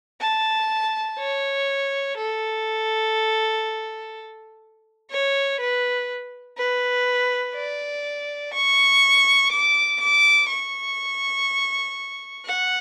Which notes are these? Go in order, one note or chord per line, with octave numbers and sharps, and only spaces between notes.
A5
C#5
A4
C#5
B4
B4
D5
C#6
D6
D6
C#6
F#5